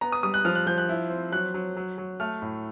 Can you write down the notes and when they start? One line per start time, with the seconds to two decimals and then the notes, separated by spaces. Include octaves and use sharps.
0.01 B3 A#5
0.12 D#6
0.23 G3 D#6
0.34 F#6
0.45 F3 F6
0.55 F#6
0.67 F3 G6
0.78 F#6
0.89 E4
1.10 C4
1.32 F#3 F#6
1.54 F#3
1.76 F#3
1.98 F#3
2.20 A3 F6
2.42 A2